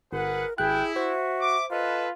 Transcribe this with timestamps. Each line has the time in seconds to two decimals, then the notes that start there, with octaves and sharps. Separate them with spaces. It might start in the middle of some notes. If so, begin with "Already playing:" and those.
0.12 G1 G#4 A#4 B4 F#5
0.58 G#1 E4 G#4 G5 F#6
0.96 F#4 C5 E5
1.41 D6
1.71 F4 A4 B4 D#5